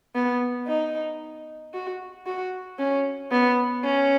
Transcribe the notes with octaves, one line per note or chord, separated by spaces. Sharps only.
B3
D#4
F#4
F#4
C#4
B3
C#4